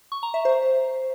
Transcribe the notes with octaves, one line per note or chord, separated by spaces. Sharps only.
C#6
A#5
E5
C5